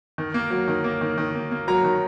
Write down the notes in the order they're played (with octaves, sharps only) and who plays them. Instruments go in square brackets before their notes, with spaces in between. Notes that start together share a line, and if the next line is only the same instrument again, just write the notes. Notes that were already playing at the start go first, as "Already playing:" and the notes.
[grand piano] D#3
A#3
F#3
D#3
A#3
D#3
D#3
A#3
A#3
F#3 A#5
D#3